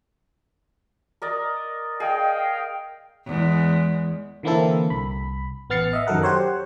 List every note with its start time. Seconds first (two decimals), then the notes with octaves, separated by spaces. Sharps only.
1.22 A#4 D5 D#5
2.00 G#4 D#5 F5 G5
3.26 E2 G#3
4.43 D3 E3 A#3 C4 E4 A4
4.90 C2 B5
5.70 A1 B3 F6 A6 C7 C#7
5.93 D#5 E5
6.07 F#2 D#3 F#3 A4 A#4 F#5
6.22 G4 C5 C#5 F#5